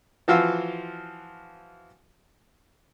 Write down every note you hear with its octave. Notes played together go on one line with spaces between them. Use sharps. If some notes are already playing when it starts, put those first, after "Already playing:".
E3 F3 F4 F#4 F5 E6